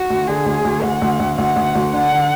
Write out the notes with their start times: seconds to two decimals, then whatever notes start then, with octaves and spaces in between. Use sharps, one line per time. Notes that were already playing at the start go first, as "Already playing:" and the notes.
Already playing: F#4
0.10 D2
0.28 D3 G#4
0.46 D2
0.65 D2
0.83 D2 F#5
1.02 D2
1.20 D2
1.38 D2 F#5
1.56 D2
1.75 D2
1.93 D3 F#5
2.12 D3